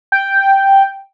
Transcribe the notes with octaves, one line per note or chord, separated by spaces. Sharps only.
G5